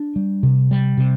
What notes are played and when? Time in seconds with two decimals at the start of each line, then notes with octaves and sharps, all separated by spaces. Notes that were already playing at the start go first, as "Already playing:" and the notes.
Already playing: D4
0.16 G3
0.43 C3
0.71 G3
0.97 C3